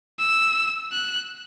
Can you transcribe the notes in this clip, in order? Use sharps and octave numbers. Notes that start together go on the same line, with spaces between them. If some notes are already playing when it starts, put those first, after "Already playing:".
E6
F#6